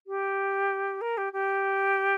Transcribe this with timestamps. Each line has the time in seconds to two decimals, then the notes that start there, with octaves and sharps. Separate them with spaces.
0.07 G4
1.01 A#4
1.17 G4
1.33 G4